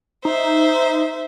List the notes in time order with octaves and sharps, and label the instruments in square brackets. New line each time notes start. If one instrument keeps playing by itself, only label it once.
[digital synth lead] D#4 [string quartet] C5 E5